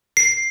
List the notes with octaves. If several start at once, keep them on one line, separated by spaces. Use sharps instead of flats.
C7